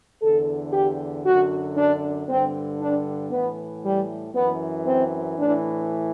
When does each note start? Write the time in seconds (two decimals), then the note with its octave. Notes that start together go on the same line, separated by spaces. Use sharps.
0.22 E2 D3 A4
0.73 G4
1.25 F#2 D3 F#4
1.76 D4
2.28 G2 D3 C4
2.80 D4
3.31 A2 E3 B3
3.84 G3
4.34 F#2 E3 B3
4.87 C4
5.38 A2 E3 D4